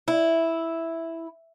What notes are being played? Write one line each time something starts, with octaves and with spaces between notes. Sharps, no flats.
E4